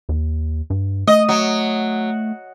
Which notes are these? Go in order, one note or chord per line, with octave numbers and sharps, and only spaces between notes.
D#2
G2
A3 D#5
F#3